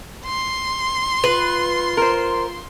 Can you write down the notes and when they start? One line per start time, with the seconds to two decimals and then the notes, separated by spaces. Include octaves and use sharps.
0.26 C6
1.24 F4 B4
1.97 A#4 C5